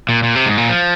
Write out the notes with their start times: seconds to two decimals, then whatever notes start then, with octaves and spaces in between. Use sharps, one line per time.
0.09 A#2
0.23 A#2
0.35 C3
0.46 G#2
0.58 A#2
0.69 F3